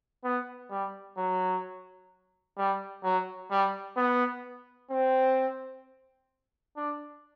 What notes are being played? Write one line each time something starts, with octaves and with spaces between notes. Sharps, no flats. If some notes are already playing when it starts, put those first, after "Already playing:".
B3
G3
F#3
G3
F#3
G3
B3
C4
D4